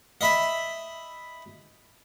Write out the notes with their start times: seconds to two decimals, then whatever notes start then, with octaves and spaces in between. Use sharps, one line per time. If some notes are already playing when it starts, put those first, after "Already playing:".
0.21 D#5 E5 B5